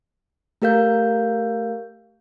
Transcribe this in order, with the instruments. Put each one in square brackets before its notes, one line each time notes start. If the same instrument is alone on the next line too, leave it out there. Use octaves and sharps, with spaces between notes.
[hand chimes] A3 G4 A#4 F5 G6